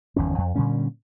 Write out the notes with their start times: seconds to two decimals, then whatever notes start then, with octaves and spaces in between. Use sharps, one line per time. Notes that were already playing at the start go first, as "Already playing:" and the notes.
0.16 G1 E2 D#3 C#4
0.38 F2
0.56 A#2 D3 G3 C#4